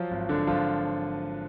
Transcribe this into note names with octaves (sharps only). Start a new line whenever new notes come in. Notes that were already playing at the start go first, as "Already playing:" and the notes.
Already playing: F3 F#3 F4
G#1
G#1 D3 D4
G#1 F3 F4